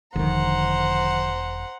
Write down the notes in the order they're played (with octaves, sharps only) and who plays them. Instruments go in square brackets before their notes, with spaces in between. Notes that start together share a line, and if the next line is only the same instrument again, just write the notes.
[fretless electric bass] E1 D#3 [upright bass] D3 F3 [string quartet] C5 F#5 A#5